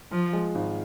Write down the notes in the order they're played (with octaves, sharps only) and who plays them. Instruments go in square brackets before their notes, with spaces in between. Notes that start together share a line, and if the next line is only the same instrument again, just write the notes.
[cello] F3 [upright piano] F4
[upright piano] G#3
G#1